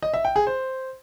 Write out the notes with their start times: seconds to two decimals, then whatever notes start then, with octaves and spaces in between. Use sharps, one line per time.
0.03 D#5
0.14 E5
0.25 G5
0.36 G#4
0.47 C5